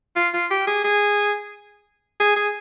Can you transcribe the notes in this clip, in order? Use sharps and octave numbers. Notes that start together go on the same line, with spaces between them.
F4
F4
G4
G#4
G#4
G#4
G#4